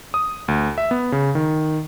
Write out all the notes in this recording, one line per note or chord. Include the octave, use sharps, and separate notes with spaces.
D#6
D2
E5
B3
C#3
D#3